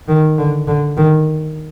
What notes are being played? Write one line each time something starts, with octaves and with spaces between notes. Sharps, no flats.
D#3
D3
D3
D#3